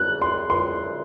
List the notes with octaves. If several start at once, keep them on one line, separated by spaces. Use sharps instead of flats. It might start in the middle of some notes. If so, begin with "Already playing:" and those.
Already playing: F#6
C6
C6